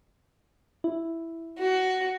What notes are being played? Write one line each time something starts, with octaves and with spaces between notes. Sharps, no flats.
E4
F#4